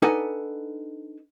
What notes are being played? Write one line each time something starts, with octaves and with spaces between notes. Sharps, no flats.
D4 D#4 A4 B4 F#5 G#5